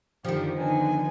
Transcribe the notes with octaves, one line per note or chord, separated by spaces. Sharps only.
F#2 D3 D#3 F3 G3 G4
D3 B3 D#4 G#5